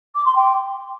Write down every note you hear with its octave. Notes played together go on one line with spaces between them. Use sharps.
D6
C6
G5